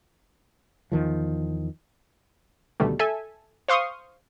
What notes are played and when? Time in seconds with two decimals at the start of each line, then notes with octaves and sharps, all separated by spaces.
0.92 E2 D#3 F3
2.80 D2 B2 D#3 G3 A3
2.99 A4 E5 G#5
3.68 C5 F5 C6 C#6 D#6